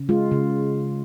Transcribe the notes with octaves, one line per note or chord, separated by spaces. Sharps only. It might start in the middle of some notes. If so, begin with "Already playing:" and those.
Already playing: C#3
G#3 F4
C#3